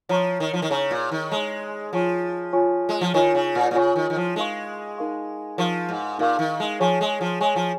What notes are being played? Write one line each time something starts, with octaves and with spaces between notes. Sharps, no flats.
F3 C#5 A#5 C#6
D#3
F3
D#3
C#3 C#5 A#5 C#6
A#2
D#3
G#3 C#5 A#5 C#6
F3 F4 C#5 G#5 C#6
F4 C#5 G#5 C#6
G#3
F3
D#3 F4 C#5 G#5 C#6
C#3
A#2
A#2
C#3 F4 C#5 G#5 C#6
D#3
D#3
F3
G#3 D#4 A#4 F5 C#6
D#4 A#4 F5 C#6
F3 D#4 A#4 F5 C#6
G#2
A#2 D#4 A#4 F5 C#6
D#3
G#3
F3 G#4 C#5 G#5 C#6
G#3
F3
G#3 G#4 C#5 G#5 C#6
F3